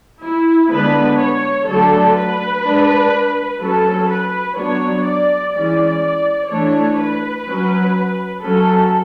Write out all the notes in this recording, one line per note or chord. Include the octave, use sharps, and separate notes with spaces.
E4
D3 G#3 B3 D4 B4
C#5
D3 F#3 A3 D4 A4
B4
G#3 D4
F#3 C#4 A4
B4
F#3 B3 D4 C#5
D5
E3 G#3 C#4 D5
E3 A3 D4 C#5
B4
F#3 C#4
F#3 C#4 A4